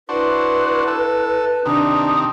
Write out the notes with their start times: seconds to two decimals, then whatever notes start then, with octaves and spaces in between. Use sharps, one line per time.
0.09 D4 E4 F#4 B4 C5
0.87 A4
1.66 C3 D#3 D4 D#6